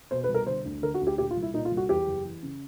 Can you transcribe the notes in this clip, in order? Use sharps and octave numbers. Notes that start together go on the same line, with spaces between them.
B2 C5
B4
C2
A#4
D3 C5
D2
D3 A#4
F#4
D2
G4
A#2 G4
F4
C2
E4
A#2 D#4
F4
C2
F#4
E2 G4
F#1
E3
C#3